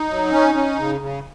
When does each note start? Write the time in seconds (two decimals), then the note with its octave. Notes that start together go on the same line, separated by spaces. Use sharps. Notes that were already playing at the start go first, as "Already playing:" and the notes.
Already playing: D#4
0.08 F#3
0.31 C#4
0.55 C#4
0.78 C#3
1.01 C#3